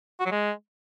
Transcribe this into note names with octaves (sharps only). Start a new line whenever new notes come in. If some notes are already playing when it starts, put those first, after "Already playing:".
F#4
F#3
G#3